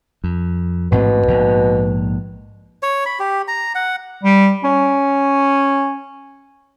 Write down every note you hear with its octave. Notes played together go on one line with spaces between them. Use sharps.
F2
A1 G#2 B2 C4
A#1 G#2
C#5
B5
G4
A#5
F#5
G3
C#4